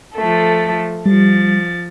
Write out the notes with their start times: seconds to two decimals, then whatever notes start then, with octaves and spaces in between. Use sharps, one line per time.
0.15 F3 A3 A4
1.06 F3 G3 A6